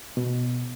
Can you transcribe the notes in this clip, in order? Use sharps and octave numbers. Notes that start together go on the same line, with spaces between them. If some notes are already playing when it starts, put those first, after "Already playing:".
B2